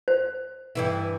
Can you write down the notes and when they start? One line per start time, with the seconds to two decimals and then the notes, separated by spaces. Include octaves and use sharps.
0.08 C5
0.75 G2 E3 E4